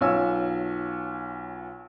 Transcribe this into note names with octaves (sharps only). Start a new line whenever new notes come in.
B1 F4 C#5 G#5 E6